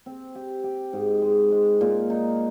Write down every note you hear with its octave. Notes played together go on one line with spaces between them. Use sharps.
C4
G4
G4
G#2
G#3
G#3
A#2
D#4